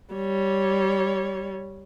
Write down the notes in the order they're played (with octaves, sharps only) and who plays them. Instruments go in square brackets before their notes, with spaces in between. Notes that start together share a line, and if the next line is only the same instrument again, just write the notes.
[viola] G3 C#5